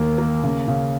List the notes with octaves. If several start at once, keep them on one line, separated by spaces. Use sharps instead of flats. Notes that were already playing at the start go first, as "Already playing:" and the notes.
Already playing: D#2 A#3
A#3
C#3
C#3